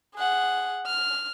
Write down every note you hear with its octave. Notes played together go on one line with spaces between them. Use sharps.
G#4 F#5
F6